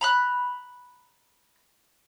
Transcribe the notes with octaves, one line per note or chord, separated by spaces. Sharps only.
A#5 B5 F#6